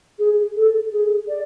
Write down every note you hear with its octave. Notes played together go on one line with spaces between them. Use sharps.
G#4
A4
G#4
D5